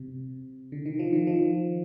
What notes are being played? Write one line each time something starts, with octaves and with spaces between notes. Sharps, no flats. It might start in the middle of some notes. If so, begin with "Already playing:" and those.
Already playing: C3
D3
D#3
F3
D#3
F3